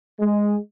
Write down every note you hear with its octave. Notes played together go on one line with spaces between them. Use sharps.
G#3